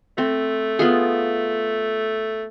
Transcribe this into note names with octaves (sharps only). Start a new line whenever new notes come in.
A3 C4
B3 F4 G#4